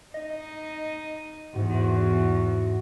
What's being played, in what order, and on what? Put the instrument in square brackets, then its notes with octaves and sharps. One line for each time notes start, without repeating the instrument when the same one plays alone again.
[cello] D#4 [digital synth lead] D#5
[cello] E2 [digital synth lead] G#2 [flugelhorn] F#4